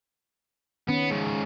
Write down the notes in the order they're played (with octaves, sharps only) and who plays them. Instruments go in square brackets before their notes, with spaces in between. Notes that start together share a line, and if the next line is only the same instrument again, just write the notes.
[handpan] D#3 C#4 [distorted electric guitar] B3
[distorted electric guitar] G#2 C#3